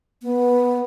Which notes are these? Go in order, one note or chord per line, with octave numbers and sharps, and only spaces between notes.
B3